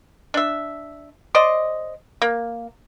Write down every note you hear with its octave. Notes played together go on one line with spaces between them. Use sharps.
D4 E5
C5 D5 D#5
A#3